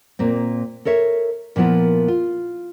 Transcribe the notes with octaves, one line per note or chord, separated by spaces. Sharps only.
A#2 A#3 C4
A4 A#4 C#5 E5
A#2 F3 B3 E4 A#4
F4